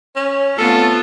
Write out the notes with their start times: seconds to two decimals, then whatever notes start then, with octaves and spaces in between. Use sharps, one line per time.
0.16 C#4 C#5
0.58 A3 B3 C4 F4 A4